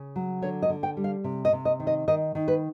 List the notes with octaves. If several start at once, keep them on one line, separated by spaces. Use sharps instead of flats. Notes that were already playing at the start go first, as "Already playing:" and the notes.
Already playing: C#3
F#3
D3 C#5
D#5
D3
G5
G3
F5
C3
D#5
C3
D#5
D#3
D#5
D#3 D#5
D#3
B4